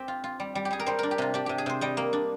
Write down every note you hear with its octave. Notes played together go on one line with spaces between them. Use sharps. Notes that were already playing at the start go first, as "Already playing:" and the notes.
Already playing: C4 G4
F4
F4
G3
G3
G4
G3 G#4
A#4
G3 C5
D4 A#4
G4
C3 F4
D4 G4
C3 G4
G#4
C3 C5
G3 D#5
A#3
D4